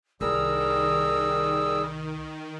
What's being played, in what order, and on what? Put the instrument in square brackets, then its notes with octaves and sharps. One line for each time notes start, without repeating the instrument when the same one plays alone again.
[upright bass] C2 [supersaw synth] D#3 [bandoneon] G3 G#4 E6 [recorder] A#4